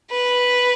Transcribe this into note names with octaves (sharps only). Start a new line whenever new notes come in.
B4